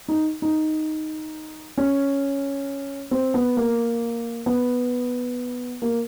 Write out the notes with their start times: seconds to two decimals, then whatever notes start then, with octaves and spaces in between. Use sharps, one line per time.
0.08 D#4
0.42 D#4
1.78 C#4
3.11 C4
3.34 B3
3.57 A#3
4.46 B3
5.82 A#3